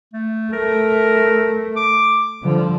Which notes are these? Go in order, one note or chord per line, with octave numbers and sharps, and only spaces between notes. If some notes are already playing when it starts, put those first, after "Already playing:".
A3
A3 A#4
D6
D3 F3 G3